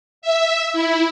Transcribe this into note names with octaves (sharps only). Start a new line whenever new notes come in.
E5
E4